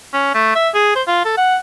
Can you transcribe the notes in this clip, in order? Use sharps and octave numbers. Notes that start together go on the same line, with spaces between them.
C#4
A3
E5
G#4
C5
F4
A4
F#5